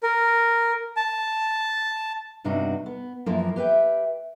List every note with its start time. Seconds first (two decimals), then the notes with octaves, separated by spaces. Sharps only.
0.03 A#4
0.97 A5
2.44 E2 G2 C3 D4 D#4 F#4
2.86 B3
3.26 F#2 E3 F3 A#3
3.56 G4 B4 E5 G5